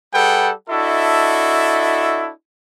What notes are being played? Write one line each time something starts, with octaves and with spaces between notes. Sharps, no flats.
G3 G#4 A4 B4 F#5 G5
D4 E4 F#4 A4 D#5 E5